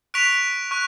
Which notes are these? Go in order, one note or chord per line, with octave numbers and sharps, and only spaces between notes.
C#6 F#6 B6 D7 F7
C#6 F#6